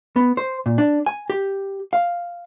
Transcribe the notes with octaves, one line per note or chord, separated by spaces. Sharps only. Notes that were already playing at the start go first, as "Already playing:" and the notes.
B3
C5
A#2
D4
G#5
G4
F5